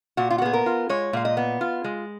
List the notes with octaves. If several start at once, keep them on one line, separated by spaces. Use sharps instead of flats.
A#2 F#4
F4
F#4
B3 G#4
A#4
F4
G#3 C#5
A#2 F5
D#5
B3
F4
G#3